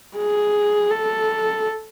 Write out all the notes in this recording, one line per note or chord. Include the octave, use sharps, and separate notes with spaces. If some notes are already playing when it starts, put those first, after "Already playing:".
G#4
A4